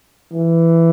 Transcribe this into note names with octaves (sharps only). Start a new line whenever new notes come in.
E3